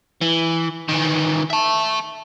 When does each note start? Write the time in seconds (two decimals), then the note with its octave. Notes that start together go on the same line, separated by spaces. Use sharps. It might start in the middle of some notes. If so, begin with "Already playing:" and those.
0.21 E3
0.88 D#3 E3
1.50 E5 A5